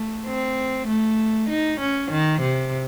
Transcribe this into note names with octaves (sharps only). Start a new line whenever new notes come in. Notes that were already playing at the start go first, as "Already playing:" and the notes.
Already playing: A3
C4
A3
D#4
C#4
D#3
C3